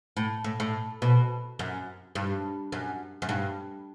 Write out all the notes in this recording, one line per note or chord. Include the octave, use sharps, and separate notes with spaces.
A2
A2
A2
B2
F#2
G2
F#2
F#2
G2